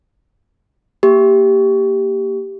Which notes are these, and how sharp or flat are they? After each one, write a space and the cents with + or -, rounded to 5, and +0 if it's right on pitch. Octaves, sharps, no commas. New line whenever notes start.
A#3 +0 G4 +0